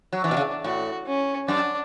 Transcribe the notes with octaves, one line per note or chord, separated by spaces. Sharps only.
F#3
E3 D4
B2
C#3
A2 F#4
C#4
F#2 D4